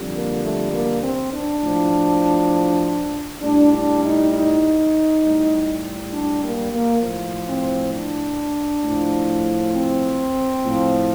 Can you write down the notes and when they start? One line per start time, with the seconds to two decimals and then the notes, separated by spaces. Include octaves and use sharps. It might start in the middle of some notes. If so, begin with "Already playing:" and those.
Already playing: F2 D3 G3
0.12 A#3
0.41 A3
0.71 A#3
1.01 C4
1.31 D4
1.61 A2 F3
3.41 A2 G3 D4
3.71 D4
4.02 D#4
4.31 D#4
5.22 A2 G3
6.12 D4
6.41 A#3
6.72 A#3
7.01 A2 F3
7.46 C4
7.91 D4
8.82 A2 F3
9.72 C4
10.61 A2 F3